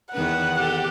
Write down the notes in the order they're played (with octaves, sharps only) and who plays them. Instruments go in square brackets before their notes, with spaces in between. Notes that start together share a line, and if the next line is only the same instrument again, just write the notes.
[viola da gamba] E2 D#3 B4 [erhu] F#5
[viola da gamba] G4 A4